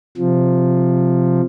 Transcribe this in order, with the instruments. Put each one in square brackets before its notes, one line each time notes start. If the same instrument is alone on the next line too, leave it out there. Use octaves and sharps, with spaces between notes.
[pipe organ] C3 F3